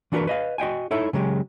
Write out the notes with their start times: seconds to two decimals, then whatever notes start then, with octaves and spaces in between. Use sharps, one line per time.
0.12 E3 D4 F#4 G4 A#4 B4
0.27 B4 D#5 F5
0.58 F#4 D#5 G5 G#5
0.91 D#4 E4 A4 C#5 E5
1.13 C#3 F#3 G#3 G4